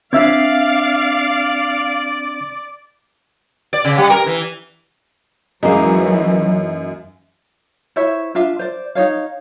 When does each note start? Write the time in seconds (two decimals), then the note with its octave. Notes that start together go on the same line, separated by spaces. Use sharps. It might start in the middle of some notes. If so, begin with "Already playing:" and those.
0.13 C4 D4 D5 E5 F5 G#6
3.73 D5
3.85 C#3
3.98 G3
4.10 A#4
4.26 E3
5.63 F#2 E3 F#3 G#3 A#3 C#4 D#4
7.96 E4 C5 C#5 E5
8.35 D4 F4 E5 F5
8.59 C5 D5
8.95 D#4 F#4 C#5 F5